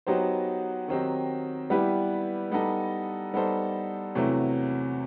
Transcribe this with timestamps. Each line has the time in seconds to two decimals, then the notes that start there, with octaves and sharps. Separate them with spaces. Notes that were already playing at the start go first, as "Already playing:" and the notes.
0.07 F#3 B3 D#4 G4 C5
0.88 D#3 F#3 C4 D#4 G4
1.70 G3 B3 E4 G4 B4
2.52 G3 B3 D#4 A4
3.34 G3 B3 D#4 A4 C5
4.15 E2 C3 F#3 A3